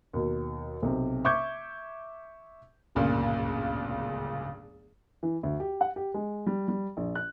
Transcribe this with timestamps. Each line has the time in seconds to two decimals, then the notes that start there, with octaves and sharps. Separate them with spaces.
0.13 D#2 B2
0.82 B1 C3
1.25 E5 C#6 D6 G6 G#6
2.95 D1 G1 C#2 A#2 C#3
5.23 E3
5.43 D2
5.60 G4
5.81 F#5
5.96 G4
6.14 G#3
6.47 G3
6.68 G3
6.97 A#1
7.15 F#6